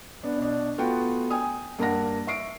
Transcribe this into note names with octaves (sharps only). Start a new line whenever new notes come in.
B3 D4
B2 D4
A3 B3 F4 F#4 G5
G5 G#5 D#6
G2 A#3 A#4 F#5 A#5 A#6
E5 C#6 C7 D7